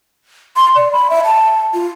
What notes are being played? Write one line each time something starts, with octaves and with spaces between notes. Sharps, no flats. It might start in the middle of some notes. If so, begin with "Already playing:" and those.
C6
D5
B5
E5
A5
F4